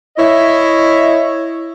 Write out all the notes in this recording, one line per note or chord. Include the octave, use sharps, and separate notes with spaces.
E4 C#5 D#5 E5